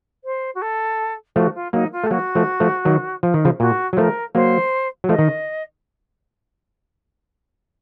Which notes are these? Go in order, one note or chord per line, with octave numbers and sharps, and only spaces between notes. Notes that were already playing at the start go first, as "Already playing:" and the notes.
C5
F#4
A4
F3 A3 F#4
F4
F#3 A#3 D#4
F4
A3
A4
F#3 A#3 F#4
F3 A3
F3 A3
D#3 F#3
F3
D#3
C#3 F3
A#2 F#4
F#3
F3 A3 A#4
F#3 A#3 C5
F#3
F3 A3 D#5
D#3